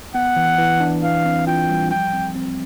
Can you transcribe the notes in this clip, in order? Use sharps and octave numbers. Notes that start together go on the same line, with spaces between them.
B3 F#5
E3
E3
D4
E3 F5
C4
F4 G5
G3
F3 G5
C4
C4